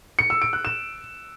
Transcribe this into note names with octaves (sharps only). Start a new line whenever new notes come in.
C#7
E6
D7
F#6
E7